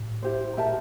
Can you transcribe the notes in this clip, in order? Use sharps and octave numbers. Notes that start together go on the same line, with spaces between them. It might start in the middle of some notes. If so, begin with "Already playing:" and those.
Already playing: A2
E4 G4 C5
A#2 G4 A#4 E5 A5